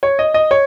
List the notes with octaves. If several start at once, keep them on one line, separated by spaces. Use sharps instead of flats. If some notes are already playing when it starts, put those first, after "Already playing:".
C#5
D#5
D#5
C#5